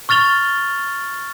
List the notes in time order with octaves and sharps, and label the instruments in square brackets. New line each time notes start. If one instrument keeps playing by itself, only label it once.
[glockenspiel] C#6 F6 A6 F7 G7